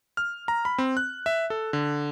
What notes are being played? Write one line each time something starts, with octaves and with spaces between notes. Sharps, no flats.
F6
A#5
B5
C4
F#6
E5
A4
D3